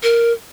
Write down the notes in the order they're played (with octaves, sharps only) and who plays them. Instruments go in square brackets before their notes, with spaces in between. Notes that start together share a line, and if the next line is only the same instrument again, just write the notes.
[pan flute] A#4